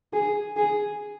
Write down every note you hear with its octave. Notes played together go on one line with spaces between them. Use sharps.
G#4
G#4